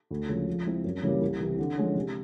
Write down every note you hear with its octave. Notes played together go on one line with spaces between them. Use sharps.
D2
C#3 F3 G#3
F3
G#3 C4 E4
F#2
C#3 E3 G3 A#3
C2
C3 E3
D3
F3 G#3 C#4
C3